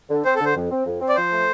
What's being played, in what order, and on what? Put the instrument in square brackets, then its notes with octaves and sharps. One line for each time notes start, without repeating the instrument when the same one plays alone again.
[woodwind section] D3
[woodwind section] C4 [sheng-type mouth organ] C5
[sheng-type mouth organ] A4
[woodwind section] D3
[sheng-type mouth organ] C5
[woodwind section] F2
C4
F2
C4
[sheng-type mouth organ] D5
[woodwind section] F3 [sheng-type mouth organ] C5
[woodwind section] A3